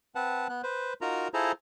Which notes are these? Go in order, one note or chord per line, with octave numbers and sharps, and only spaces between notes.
C4 B4 F#5 A5
B3 F#6
B4 C5
D#4 F4 F#4 A#4 A#5
E4 F4 G#4 A4 C5 A#5